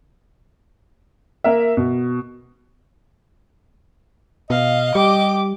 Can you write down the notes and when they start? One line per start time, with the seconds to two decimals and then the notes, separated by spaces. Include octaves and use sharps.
1.44 A#3 A#4 E5
1.77 B2
4.50 B2 D#5 F5
4.95 G3 G4 D6